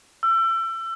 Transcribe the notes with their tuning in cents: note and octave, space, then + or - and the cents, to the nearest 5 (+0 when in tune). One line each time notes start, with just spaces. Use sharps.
E6 +30